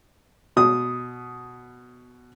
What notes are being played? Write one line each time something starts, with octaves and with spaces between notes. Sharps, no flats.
B2 D#6